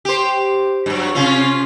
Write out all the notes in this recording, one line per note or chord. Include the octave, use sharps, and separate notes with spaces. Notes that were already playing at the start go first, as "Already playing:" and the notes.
G4 C5
G2 F#3
C3 C#4 F4